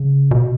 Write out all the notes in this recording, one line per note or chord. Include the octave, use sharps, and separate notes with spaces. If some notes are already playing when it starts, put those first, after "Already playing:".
Already playing: C#3
B2